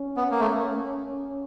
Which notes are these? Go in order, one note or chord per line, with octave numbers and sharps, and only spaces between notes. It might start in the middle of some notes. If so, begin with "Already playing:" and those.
Already playing: C#4
B3
A#3
A3